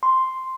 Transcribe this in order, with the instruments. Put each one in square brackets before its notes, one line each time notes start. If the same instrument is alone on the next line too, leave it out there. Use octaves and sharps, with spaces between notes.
[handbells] C6